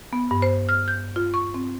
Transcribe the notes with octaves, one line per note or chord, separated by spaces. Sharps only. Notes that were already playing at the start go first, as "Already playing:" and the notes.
B3
G2
C5
F6
G6
F4
C#6
C4